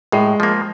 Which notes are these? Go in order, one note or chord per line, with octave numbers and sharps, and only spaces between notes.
A2 G#3
F3 A#3